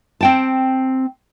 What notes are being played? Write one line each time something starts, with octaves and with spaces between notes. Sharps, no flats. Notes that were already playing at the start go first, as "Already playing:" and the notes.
C4 G5 A5